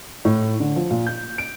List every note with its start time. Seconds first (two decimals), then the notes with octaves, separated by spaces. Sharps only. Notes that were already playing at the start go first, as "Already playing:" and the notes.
0.25 A2
0.60 D3
0.76 F3
0.91 A#2
1.07 G6
1.38 D7